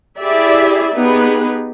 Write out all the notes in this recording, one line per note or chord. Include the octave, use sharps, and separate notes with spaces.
E4 G4 G#4 D5 E5
B3 D#4 G4 G#4 B4